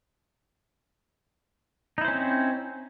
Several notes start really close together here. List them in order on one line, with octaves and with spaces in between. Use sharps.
D#4 E4 C5 C#4 C4